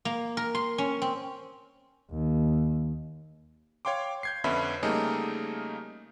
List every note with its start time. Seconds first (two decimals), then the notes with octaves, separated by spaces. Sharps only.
0.05 A#3
0.37 A#4
0.55 C6
0.78 C#4
1.02 C4
2.11 D#2
3.85 C#5 F5 G5 C6 D6
4.23 G6 G#6 C7
4.44 F2 D3 B3 C#4 E5 B5
4.83 C#3 G3 A3 A#3 D#4 G#4